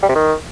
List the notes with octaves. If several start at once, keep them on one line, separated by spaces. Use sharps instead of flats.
G3
C3
D#3